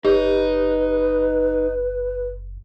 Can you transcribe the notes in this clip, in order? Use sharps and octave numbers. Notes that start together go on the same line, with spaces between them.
F#1 D#4 G4 B4 C#5